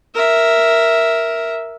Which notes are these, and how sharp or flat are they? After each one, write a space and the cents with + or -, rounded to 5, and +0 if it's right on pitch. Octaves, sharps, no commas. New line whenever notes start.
A#4 +0 E5 +0